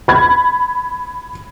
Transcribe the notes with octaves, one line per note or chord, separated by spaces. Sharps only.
B5 G#6